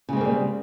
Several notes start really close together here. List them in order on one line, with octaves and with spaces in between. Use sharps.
C#3 G#3 C4 A#3 G3